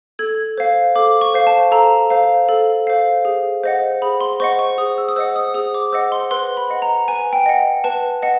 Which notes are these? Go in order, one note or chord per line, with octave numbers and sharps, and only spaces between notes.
A4 G#6
C5 F5
A4 D6
C#6
C5 F5
A5
A4 A#5
C5 F5
A4
C5 F5
G#4
C5 D#5 F#5
G#4 B5
C6
C5 D#5 F#5 C#6
C#6
G#4 D#6
E6
D#6
C5 D#5 F#5 E6
D#6
G#4 D#6
D6
C5 D#5 F#5 E6
C6
B4 C6
B5
D#5 F#5
A#5
B4 G#5
G5
D#5 F#5
B4 A5
D#5 F#5